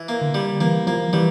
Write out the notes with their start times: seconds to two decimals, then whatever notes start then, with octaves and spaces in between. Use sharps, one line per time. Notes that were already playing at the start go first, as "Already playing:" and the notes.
Already playing: E3
0.09 A#3
0.21 D3
0.34 G3
0.61 E3 A#3
0.87 F3 A#3
1.13 E3 G3